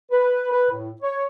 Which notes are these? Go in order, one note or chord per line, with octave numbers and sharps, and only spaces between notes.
B4
B4
A2
C#5